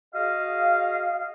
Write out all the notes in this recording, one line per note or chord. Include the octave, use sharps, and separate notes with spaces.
F#4 G#4 D#5 F5